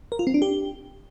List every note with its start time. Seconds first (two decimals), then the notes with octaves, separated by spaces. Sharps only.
0.12 A#4
0.19 F4
0.27 C4
0.34 D4
0.42 G4